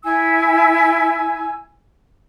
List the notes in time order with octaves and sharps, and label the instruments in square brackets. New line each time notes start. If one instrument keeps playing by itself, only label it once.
[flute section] E4 G#5 E6